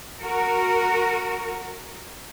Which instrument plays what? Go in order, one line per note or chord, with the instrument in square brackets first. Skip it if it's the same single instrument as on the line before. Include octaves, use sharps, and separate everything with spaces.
[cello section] F#4 A#4